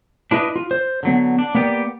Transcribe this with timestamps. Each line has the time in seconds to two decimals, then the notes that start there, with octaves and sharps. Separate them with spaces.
0.31 D4 E4 B4 D#5
0.56 F4
0.71 C5
1.03 D3 F#3 B3
1.39 D4
1.55 A#3 B3 G4 D5